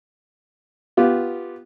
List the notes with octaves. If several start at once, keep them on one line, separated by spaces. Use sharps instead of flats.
B3 F4 G4